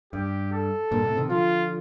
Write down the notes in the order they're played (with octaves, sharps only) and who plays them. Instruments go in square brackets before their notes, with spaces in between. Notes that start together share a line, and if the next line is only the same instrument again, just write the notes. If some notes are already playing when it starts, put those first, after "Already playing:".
[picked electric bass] G2 [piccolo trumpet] G4
[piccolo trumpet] A4
[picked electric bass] G2 A#2
A2 C3
C3 D#3
[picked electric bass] D3 F3 [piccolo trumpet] F4